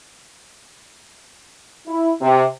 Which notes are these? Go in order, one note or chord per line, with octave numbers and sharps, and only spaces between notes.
E4
C3